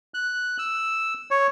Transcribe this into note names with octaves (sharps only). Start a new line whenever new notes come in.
F#6
E6
C#5